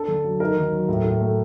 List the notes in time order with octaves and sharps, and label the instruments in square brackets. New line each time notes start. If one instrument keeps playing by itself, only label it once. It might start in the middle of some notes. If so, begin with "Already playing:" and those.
Already playing: [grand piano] D4 A4
D3
F#3
D#4 A#4
D#3
F#3
A2
A2
A3